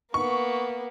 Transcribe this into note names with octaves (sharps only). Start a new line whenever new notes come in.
A#3 B3 C#6